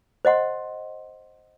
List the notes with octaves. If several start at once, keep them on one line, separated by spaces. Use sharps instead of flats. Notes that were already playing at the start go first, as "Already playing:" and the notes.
C5 D#5 F#5 C6